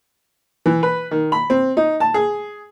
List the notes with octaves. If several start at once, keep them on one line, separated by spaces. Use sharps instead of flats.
E3
B4
D#3
B5
C4
D#4
A5
G#4